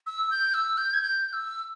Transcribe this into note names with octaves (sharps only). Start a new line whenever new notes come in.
E6
G6
E6
G6
G#6
G6
E6